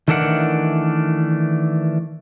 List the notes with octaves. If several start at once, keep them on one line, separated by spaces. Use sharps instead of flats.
D#3 E3 A3 D4 A#4 F#5